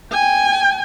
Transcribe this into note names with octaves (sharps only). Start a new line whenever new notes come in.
G5 G#5